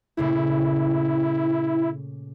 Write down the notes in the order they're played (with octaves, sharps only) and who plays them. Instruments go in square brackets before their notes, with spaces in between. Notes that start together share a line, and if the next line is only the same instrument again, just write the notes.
[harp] A#2 C#3 A3 [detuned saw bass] E4